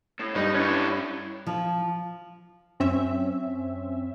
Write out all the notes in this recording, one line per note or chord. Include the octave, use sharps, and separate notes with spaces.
A2
G2 G3 D#4
C#4 D4 E4 B4 C#5
F3
F#2 C4 C#4 E5